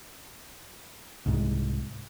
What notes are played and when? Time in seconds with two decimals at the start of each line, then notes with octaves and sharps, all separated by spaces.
1.26 C2 G#2